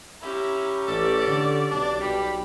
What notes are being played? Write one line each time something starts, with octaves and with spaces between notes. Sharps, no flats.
C#4 E4 G4 A#5
A1 A4 D5
D3
B1 D4
B1 G3 G4 B5